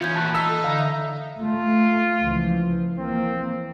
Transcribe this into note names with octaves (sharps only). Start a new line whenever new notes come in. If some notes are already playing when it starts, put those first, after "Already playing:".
E3 B3 C#4 F4 G6 G#6
A#2 F#4 A5 B5 F#6
D#4 E6 B6
A4
D3 F5 A#5
E5
A3 F4
C#2 E3 F3
E3 A#3 C4